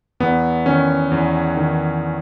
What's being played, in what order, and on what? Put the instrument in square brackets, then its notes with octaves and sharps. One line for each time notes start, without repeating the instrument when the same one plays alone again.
[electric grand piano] E2 B3
D#3 C#4
E2
D#3